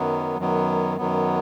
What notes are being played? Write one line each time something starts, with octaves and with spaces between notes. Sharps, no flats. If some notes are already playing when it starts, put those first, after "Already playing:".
Already playing: F#2 D#3 F#3 B3
F#2 D#3 F#3 B3
F#2 D#3 F#3 B3